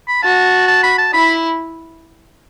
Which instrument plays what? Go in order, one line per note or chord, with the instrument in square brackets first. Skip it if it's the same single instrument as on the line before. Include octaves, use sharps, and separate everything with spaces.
[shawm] B5
[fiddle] F#4 [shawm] A5
[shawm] A5
B5
A5
[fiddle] E4 [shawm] B5